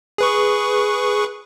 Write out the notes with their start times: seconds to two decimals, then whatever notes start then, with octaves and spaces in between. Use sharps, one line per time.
0.18 G#4 B4 C#6